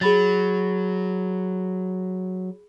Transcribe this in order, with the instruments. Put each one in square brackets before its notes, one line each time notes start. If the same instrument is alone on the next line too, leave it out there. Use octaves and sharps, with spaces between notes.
[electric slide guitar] F#3 [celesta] G#4 B5 A6